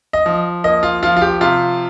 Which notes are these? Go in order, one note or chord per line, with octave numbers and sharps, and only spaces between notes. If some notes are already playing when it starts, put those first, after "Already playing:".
D#5
F3
A#3 D#5
F4
F3 F4
F4
G4
C3 F4